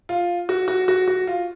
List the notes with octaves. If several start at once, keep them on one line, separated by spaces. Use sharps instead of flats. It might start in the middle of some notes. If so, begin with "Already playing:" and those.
F4
F#4
F#4
F#4
F#4
F4